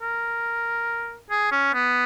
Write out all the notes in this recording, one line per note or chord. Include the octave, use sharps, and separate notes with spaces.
A#4
G#4
C#4
B3